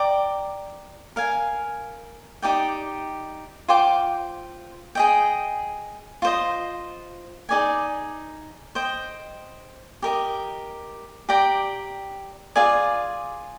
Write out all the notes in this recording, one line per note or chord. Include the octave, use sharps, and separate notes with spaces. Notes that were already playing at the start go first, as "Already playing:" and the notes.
Already playing: D5 G5 A#5 D6
A#4 F5 G#5
D#4 G4 D5 G5
F4 C5 G5 D6
G#4 D#5 G5
F4 C5 D#5
D#4 G#4 D5 G#5
C5 D#5 G5
G4 A#4 D#5
G4 D5 G5 A#5
F4 G#4 D5 G#5